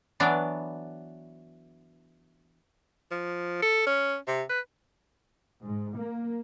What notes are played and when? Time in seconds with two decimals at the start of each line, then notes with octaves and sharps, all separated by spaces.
0.20 E3 F#3 B3 D4 D5
3.11 F3
3.62 A4
3.86 C#4
4.28 C3
4.49 B4
5.64 G#2
5.97 A#3